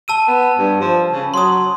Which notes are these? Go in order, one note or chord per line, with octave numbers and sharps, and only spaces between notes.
A5 E6 D#7
B3
G2
F3
C#3
F#3 C6 D#6